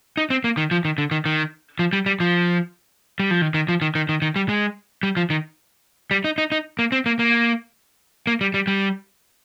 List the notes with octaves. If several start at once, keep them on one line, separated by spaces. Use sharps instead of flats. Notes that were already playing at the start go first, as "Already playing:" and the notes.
D#4
C4
A#3
D#3
F3
D#3
D3
D#3
D#3
F3
G3
G3
F3
G3
F3
D#3
D#3
F3
D#3
D#3
D#3
D#3
G3
G#3
G3
F3
D#3
G3
D#4
D#4
D#4
A#3
C4
A#3
A#3
A#3
G3
G3
G3